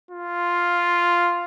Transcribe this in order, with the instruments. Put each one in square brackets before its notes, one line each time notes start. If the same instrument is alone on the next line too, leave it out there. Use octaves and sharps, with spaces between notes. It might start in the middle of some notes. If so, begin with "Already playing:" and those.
[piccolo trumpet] F4